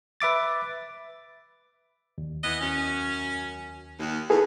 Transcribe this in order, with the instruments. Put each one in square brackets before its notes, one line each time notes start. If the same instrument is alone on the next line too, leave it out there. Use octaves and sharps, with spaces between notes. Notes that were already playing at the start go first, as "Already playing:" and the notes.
[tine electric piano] B4 E5 D6 A6
[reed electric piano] D#2
[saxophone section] E3 B3 D#5
F#2 C#4
D#2
[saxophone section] E2 [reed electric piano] G#4 A4 B4